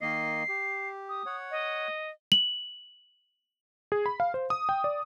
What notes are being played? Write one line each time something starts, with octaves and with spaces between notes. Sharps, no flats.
D#3 A#3 D#5 C7
G4
D#6
C#5 F#5
D#5
F#7
G#4
B5
F5
C5
D#6
G5
D5